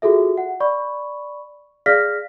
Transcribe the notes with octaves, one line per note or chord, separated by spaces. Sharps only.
F4 F#4 G#4 A4 E5
F#5
D5 B5 C#6
G#4 D5 F5 F6 A#6 B6